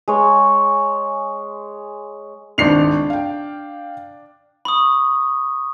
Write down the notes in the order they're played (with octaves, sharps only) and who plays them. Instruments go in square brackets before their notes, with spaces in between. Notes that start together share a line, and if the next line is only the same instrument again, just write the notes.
[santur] G#3 C#5
[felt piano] G#1 C#2 [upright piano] D4 C7 F7
[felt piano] F5 G5
[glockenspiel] B5 C#6 D#6